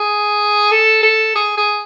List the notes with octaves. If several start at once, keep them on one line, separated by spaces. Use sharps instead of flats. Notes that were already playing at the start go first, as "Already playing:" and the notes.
Already playing: G#4
A4
A4
G#4
G#4